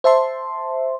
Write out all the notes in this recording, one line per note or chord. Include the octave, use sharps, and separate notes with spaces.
C5 E5 A5 C6